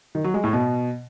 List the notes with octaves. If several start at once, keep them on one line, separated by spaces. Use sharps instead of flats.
D#3
F#3
G#3
A2
B2